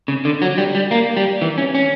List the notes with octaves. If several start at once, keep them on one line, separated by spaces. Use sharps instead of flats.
C#3
D3
F#3
G3
G3
A#3
G3
E3
C#4
C#4